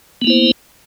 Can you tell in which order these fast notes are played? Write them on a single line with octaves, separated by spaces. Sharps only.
B3 A#3 E4 C5